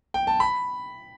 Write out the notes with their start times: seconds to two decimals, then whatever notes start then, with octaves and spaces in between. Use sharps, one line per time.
0.14 G5
0.27 A5
0.40 B5